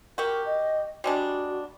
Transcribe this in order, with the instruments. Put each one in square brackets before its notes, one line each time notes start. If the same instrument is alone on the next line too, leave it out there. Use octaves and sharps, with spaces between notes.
[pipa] F#4 G4 [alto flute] A#4
[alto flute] D#5
[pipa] G3 G#3 D4 [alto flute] F#4